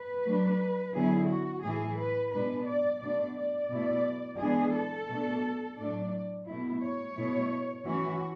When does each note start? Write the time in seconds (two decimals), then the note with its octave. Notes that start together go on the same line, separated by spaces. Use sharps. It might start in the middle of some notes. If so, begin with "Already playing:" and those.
Already playing: B4
0.24 F#3 A3 D4
0.93 D3 F#3 B3 E4 G#4
1.28 F#4
1.63 A2 E3 A3 E4 G#4
1.98 B4
2.32 B2 G#3 D4 B4
2.67 D5
3.02 B2 A3 D4 D5
3.36 D5
3.70 B2 A3 E4
4.40 E3 G#3 B3 D4 G#4
4.75 A4
5.09 B2 A3 D4
5.78 A2 F#3 A3 D4 D5
6.47 B2 A3 E4
6.82 C#5
7.17 B2 A3 E4
7.86 E3 A3 C#4 E4 F#4